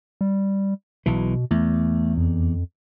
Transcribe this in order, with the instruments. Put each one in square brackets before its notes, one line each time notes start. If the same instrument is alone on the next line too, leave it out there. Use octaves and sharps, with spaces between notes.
[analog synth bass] G3
[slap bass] B1 E3 [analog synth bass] B2
[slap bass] E2 [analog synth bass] A3
[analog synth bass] F2